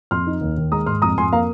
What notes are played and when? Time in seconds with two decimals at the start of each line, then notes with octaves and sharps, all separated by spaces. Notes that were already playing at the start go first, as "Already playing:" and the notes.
0.11 F2 C6 F6
0.26 D#4
0.41 D#2
0.57 D#3
0.72 G#3 A#5 D#6
0.86 G#2 C6 F6
1.02 F2 A#5 D#6
1.18 F2 G#5 C6
1.32 A#3 F5 A#5